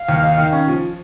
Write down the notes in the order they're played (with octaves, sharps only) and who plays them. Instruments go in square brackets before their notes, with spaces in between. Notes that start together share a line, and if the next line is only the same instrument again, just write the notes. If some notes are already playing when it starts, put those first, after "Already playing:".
Already playing: [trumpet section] F5
[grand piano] D#2
D#4
D#3
C#4
F3